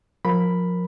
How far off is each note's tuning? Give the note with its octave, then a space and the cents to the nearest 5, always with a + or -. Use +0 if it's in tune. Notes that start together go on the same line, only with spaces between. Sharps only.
F3 +30 A#4 +0 B5 +0